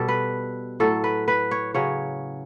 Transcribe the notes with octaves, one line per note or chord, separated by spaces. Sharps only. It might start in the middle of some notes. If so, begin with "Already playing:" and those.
Already playing: B2 G3 A4
B4
A2 F#3 A4
B4
B4
C#5
C#3 F#3 C#5